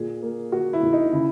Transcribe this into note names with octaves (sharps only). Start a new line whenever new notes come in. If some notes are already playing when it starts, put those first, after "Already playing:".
Already playing: A#2 G#4
A#3
A#3 F#4
E4
A#2
D#4
C#3 E4